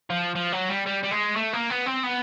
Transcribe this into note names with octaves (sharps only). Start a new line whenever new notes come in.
F3
F3
F#3
G3
G3
G3
G#3
A3
A#3
B3
C4
B3